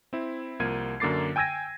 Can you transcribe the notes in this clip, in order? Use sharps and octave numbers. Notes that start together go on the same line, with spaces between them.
C4 E4
C2 F3 A#3 G#6 D#7
F#2 D3 A#3 D6 A6 C7
G5 G#5 E6 G#6 A#6 D#7